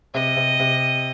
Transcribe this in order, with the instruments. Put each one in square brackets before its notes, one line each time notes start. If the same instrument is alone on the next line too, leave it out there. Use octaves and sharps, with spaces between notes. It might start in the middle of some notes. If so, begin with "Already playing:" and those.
[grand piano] C3 [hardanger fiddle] D#5
[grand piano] C3
C3